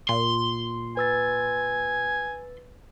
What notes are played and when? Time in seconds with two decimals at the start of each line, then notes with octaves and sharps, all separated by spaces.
0.09 A#2 C6
0.97 B4 G#5 E6 A6